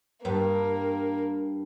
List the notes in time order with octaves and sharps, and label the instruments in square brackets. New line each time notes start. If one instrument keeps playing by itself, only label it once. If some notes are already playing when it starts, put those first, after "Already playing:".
[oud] G2 [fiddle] A#3